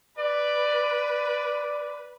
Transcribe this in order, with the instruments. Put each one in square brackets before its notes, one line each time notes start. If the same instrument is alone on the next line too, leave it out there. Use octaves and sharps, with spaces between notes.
[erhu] B4 [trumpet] D5